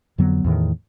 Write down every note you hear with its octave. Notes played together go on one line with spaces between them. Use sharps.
F2 D3 F#3 B3
E2 A2 D#3